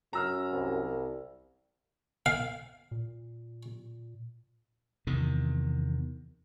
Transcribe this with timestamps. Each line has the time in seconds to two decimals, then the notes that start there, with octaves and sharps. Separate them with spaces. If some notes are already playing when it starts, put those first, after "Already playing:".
0.13 F#2 A#5 E6 F6
0.52 C2
2.26 F5
2.91 A#2
5.07 E2 C3 D#3